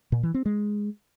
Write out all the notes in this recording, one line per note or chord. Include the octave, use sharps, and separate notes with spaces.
A#2
E3
C4
G#3